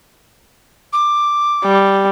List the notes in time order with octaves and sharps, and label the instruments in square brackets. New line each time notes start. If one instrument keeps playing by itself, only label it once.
[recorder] D6
[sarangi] G3